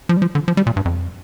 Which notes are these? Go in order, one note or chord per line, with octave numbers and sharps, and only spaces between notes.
F3
G3
F3
D3
F3
G3
A#2
G2
F2